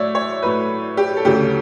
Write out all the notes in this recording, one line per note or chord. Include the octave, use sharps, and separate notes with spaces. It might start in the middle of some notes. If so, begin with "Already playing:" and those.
Already playing: A2 F#3 A3 C#5 D5 E5
C#5
A2 F#3 A3 B4
G4
A4
D2 C#3 F#3 A3 G4